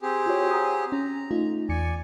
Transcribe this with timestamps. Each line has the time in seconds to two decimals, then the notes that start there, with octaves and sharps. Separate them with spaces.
0.02 C4 G4 G#4
0.26 F4 F#4 C#5
0.51 F#5 A#5 D#6
0.92 C#4 A#5
1.31 A3 D#4 F4
1.69 E2 D5 G#5 C#7